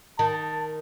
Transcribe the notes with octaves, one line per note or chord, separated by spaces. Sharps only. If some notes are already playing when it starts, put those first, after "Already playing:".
D#3 A5